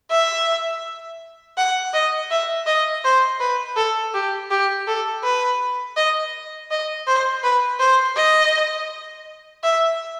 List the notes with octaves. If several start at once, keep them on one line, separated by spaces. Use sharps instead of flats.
E5
F#5
D#5
E5
D#5
C5
B4
A4
G4
G4
A4
B4
D#5
D#5
C5
B4
C5
D#5
E5